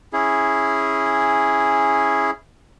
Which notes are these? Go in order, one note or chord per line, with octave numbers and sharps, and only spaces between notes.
C#4 E4 G#4